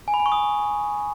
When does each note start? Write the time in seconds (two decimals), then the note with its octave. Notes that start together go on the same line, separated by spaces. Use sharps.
0.08 G#5
0.14 B5
0.20 G#5
0.26 C#6
0.32 D#6